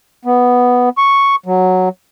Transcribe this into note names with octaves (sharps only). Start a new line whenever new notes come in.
B3
C#6
F#3